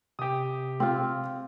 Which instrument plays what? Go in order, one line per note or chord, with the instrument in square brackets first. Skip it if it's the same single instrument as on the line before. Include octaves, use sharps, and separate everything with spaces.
[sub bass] C3 [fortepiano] G4 D#6
[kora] C4 F4